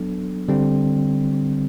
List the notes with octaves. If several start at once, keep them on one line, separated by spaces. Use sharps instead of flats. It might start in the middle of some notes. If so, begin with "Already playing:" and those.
Already playing: F#3 B3 D4 A4
D3 G3 C4